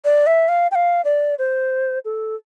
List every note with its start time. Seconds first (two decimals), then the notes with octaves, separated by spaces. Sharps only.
0.05 D5
0.26 E5
0.48 F5
0.71 G5
0.75 F5
1.04 D5
1.39 C5
2.05 A4